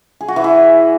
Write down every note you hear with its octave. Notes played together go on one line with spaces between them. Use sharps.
G#4
F#4
E3
E4